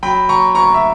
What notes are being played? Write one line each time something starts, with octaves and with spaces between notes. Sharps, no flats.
F#3 G5 B5
F#3 A#5 C#6
D2 A#5 C#6
E5